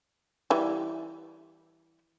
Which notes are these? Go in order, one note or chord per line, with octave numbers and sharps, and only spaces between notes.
E3 G3